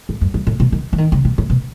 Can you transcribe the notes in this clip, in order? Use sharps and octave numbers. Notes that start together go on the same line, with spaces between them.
G#2
F#2
F#2
A2
B2
D#3
E3
D#3
C#3
B2
A2
B2